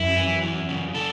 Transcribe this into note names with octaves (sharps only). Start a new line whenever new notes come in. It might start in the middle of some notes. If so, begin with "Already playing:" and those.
Already playing: F#2 E4
E3
E2
C#3
A4